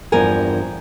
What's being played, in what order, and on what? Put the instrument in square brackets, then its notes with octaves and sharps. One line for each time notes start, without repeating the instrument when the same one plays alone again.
[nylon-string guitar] E2 G2 F3 A#4 G#5